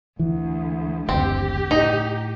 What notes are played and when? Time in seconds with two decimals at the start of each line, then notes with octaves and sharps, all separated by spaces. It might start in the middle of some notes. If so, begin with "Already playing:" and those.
0.19 D2 E3
1.09 F#1 D2 C4 G4
1.71 A2 D#4